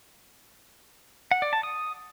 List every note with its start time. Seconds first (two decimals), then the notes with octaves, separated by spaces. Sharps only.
1.31 F#5
1.42 D5
1.53 A5
1.63 D#6